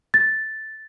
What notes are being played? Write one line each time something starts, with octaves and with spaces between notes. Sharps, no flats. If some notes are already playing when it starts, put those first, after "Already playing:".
A6